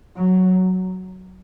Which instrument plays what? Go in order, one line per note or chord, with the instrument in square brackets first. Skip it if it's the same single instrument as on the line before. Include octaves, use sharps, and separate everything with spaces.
[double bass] F#3